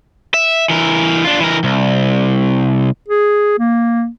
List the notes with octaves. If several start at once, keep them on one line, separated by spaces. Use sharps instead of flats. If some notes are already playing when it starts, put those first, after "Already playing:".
E5
E3 A#4
D4 F4
E3 A#4
C2
G#4
A#3